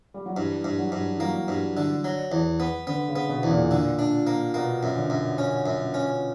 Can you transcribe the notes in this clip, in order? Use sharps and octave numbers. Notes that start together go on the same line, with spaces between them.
G3
F#3
G2 E3
G2
F#3
G2
E3
F#3 A#3
G2
D3
F#3
E2
B3
D3 B3
C#3
B3
B2
E2
A#2
D3
D4
A#3
B2 A#3
F#2
D3
F#2
C#4
F#2
C#4